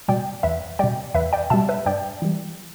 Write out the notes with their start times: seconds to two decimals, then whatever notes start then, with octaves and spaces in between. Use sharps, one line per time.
0.08 B2 G3 D5 G5
0.43 E2 B4 E5
0.79 B2 G3 D5 G5
1.14 E2 B4 E5
1.33 D5 G5
1.50 B2 E5 A5
1.54 G3
1.69 B4 E5
1.86 G2 D5 G5
2.22 E3 G3